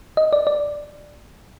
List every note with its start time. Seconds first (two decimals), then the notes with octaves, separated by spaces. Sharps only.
0.17 D#5
0.33 D5
0.47 D5